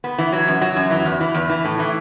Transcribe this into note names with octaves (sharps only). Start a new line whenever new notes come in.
B3
E3
F#3
F#2
F#3
F#2
E3
E2
E3
E2
E3
A2
E3